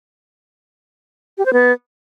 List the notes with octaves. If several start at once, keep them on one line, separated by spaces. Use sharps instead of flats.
G4
C5
B3